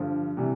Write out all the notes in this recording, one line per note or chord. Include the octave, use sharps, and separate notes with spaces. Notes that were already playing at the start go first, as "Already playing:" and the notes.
Already playing: G2 D3 F3
C3 E3 G3